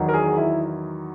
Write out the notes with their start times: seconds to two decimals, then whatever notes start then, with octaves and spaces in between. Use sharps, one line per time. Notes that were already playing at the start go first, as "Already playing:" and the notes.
Already playing: E2 D#3 F#3
0.09 A#4
0.14 G#4
0.37 E4